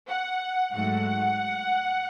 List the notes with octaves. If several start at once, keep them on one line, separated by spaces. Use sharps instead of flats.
F#5
G#2 F#3 A3 F#5